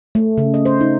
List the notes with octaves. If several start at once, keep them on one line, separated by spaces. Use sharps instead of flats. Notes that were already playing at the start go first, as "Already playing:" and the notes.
A3
C#3
D#5
C5
D#4